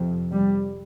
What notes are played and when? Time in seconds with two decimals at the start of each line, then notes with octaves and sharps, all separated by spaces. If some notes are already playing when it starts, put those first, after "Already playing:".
Already playing: F2 C3
0.31 G3